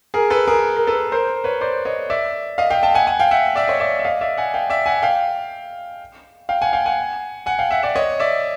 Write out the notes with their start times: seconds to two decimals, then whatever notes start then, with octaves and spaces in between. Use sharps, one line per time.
0.14 G#4 A#4
0.30 A4 B4
0.48 G#4 A#4
0.77 A#4
0.87 A4 B4
1.12 A#4 C5
1.44 B4 C#5
1.61 C5 D5
1.85 C#5 D#5
2.10 D5 E5
2.58 D#5 F5
2.70 F5 G5
2.83 G5 A5
2.95 F#5 G#5
3.07 F#5 G#5
3.20 F5 G5
3.31 E5 F#5
3.56 D5 E5
3.68 C#5 D#5
3.80 D5 E5
3.99 E5
4.05 D#5 F5
4.21 D5 E5
4.37 F#5 G#5
4.54 F5 G5
4.70 D5 E5
4.86 F#5 G#5
5.03 F5 G5
6.49 F5 G5
6.62 F#5 G#5
6.73 F5 G5
6.85 F#5 G#5
7.46 F#5 G#5
7.59 F5 G5
7.71 E5 F#5
7.83 D5 E5
7.96 C#5 D#5
8.20 D5 E5